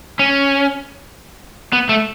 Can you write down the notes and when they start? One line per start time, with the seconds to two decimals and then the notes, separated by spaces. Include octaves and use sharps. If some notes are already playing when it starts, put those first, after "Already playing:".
0.19 C#4
1.73 B3
1.89 A3